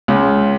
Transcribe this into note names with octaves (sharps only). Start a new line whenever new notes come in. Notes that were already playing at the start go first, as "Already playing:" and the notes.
C#2